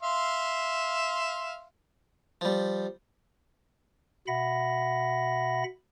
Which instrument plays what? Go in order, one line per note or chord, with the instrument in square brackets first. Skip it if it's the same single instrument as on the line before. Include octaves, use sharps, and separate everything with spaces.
[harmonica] E5 F5 C6
[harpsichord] F3 G3
[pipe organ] B2 E5 F#5 B5 A#6